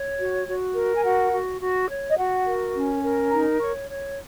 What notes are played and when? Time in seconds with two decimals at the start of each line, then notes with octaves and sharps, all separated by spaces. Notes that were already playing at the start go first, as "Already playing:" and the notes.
Already playing: C#5
0.18 F#4
0.47 F#4
0.75 A#4
0.95 G#5
1.03 F#4 F#5
1.32 F#4
1.61 F#4
1.89 C#5
2.08 D#5
2.17 F#4 F#5
2.46 A#4
2.74 C#4
3.03 A#4
3.32 D#4 A#5
3.60 C#5 C#6
3.88 C#5